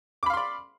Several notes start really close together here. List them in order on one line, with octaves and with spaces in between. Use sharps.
D6 B5 F5 C6 D5